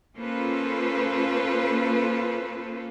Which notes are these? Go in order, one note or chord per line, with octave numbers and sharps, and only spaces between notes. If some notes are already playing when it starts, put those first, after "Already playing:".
A#3 C#4 F4 A4 B4 C5